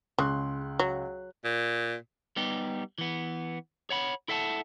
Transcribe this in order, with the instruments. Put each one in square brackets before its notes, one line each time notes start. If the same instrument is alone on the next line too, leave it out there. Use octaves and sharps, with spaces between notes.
[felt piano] C#2 C6 F#6 [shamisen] C#3
[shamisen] F#3
[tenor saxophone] A#2
[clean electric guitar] G3 B3 D#4 G4
E3 B3
C#5 F#5 B5
E4 A4 E5 F#5 G#5 A5